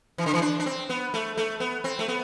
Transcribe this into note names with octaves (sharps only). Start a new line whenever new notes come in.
E3
D3
E3
D4
D4
C4
B3
A3
A3
B3
C4
A3
B3